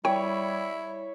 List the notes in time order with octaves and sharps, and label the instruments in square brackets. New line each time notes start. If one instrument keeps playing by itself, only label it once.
[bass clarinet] G3 [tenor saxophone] E4 [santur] C#5 [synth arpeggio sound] G5